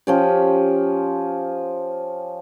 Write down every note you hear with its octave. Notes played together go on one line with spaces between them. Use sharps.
F3 C#4 G4